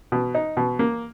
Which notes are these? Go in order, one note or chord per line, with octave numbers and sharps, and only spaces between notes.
B2
D#4
B2
A#3